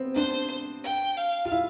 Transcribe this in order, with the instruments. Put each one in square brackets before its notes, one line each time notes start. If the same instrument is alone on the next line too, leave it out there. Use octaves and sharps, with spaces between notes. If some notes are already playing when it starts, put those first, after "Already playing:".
Already playing: [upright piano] B3 C4
[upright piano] D4 [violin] C5
[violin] G5
F5
[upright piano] F4
E4